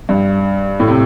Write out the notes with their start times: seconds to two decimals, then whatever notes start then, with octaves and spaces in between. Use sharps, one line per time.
0.09 G2
0.80 A2
0.88 C3